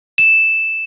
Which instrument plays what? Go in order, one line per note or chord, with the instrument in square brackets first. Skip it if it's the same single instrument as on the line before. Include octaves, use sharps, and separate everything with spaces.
[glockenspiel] E7